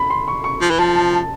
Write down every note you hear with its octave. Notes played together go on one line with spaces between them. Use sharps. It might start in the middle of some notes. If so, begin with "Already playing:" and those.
Already playing: B5
C6
C#6
C#6
F3
E3
F3 A5
A5
A5